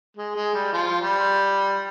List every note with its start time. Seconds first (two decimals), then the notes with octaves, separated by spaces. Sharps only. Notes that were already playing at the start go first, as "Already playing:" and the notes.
0.17 G#3
0.36 G#3
0.54 G3
0.73 F3
1.01 G3